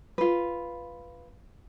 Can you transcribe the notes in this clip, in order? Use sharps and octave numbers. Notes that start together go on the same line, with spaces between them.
F4 B4